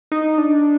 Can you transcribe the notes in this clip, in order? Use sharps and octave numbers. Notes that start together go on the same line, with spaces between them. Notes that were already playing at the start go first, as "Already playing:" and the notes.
D#4
D4